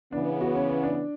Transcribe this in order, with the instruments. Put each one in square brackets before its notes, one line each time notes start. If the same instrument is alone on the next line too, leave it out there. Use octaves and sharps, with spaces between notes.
[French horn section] C#3 E3 B3 [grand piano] D4
[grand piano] F#4
C#4
C#4
D4